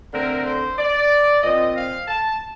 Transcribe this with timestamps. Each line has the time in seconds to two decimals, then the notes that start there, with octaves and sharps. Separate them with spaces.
0.13 D3 A3 C4 A#4
0.45 C5
0.78 D5
1.43 A#2 F3 C4 D#5
1.76 F5
2.08 A5